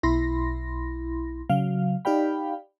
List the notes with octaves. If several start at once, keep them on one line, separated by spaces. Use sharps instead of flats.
B1 E4 B5 C6 A#6
C#3 F#3 F5
D#4 G4 D5 F5 G5 B5